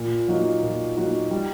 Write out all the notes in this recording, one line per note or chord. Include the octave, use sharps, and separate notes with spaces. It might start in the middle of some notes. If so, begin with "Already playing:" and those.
Already playing: A#2
F#3 A#3 D#4 F#4
A#2
F#3 A#3 D#4 F#4
G3